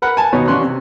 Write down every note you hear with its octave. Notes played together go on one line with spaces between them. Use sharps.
A#4 B4 F#5 B5
G#5 A5
D#2 B2 B3 D#4 C#5
A1 C#4 D5 C6 F#6
C3